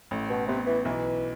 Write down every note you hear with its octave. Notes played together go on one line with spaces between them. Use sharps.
A1 A2
B2
C3 B3
E3
B1 E3